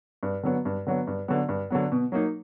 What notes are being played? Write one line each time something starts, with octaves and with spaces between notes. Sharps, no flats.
G2
D3 F#3 B3
G2
D3 F#3 B3
G2
D3 F#3 B3
G2
D3 F#3 B3
B2
F#3 A#3 D#4